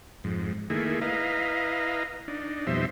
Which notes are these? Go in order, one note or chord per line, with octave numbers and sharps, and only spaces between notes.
F2 G#2
D#3 A3 A#3 E4 G#4
E4 B4 D#5 F5 A#5
D4 D#4
F2 B2 G3 D#4 C5 E5